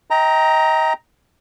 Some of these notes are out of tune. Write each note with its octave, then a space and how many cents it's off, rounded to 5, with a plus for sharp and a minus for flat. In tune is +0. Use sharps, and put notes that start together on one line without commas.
D#5 +30 G5 -5 A#5 +0